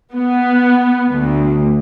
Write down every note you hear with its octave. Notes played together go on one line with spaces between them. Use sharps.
B3
D2